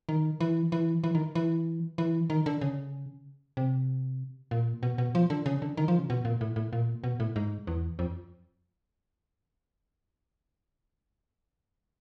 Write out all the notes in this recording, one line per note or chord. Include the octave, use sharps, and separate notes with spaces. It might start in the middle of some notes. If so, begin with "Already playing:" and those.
D#3
E3
E3
E3
D#3
E3
E3
D#3
D3
C#3
C3
A#2
B2
B2
F3
D3
C#3
D3
D#3
F3
C#3
B2
A#2
A2
A2
A#2
B2
A2
G#2
E2
F2